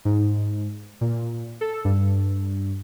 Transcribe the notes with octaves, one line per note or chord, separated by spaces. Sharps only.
G#2
A#2
A4
G2